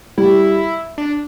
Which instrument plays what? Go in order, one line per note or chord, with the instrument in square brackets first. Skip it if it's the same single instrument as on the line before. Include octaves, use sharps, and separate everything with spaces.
[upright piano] G3 [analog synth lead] E4
[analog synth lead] D4